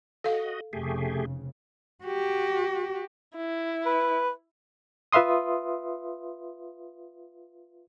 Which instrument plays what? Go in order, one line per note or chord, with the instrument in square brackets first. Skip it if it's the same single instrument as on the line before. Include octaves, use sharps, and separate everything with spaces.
[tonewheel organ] F#4 D#5 [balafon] A4 F5
[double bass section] F1 C#3 [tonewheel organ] A3 G4 G#4
[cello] F#4 G4
[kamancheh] E4
[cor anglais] B4
[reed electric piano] F4 B4 E5 F5 C6 D#6